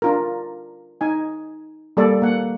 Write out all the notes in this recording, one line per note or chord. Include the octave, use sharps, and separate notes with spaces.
D4 F4 A#4
D#4 G#5
G3 A#3 A4 D5
A#3 F#5